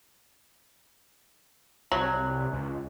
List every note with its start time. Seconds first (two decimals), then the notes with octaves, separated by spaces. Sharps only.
1.92 C2 F#3
2.53 C#2